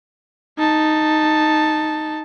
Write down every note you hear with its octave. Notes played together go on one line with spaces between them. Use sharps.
D#4 A5